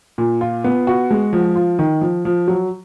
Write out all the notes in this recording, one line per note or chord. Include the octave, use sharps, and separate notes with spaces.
A#2
F4
B3
F#4
G#3
F3
F4
D#3
F3
F3
F#3